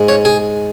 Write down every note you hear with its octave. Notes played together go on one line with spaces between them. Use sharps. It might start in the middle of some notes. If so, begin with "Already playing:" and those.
Already playing: G#2 G#3
C#5
G#4